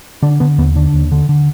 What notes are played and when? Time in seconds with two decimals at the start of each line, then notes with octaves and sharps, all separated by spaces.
0.22 D3 D4
0.40 D3 B3
0.58 D#2 B3
0.76 D3 D4
0.94 D#2
1.12 D3
1.29 D3